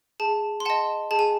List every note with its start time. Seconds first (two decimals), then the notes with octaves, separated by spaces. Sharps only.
0.20 G#4 A5
0.60 C6
0.65 D#5 F#5 A5
1.11 G#4 A5
1.19 G#5